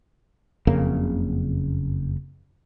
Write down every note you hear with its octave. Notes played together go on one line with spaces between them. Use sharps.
F#1 F2 C#3 A#3